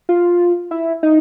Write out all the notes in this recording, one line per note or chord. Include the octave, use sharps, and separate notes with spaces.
F4
E4
D#4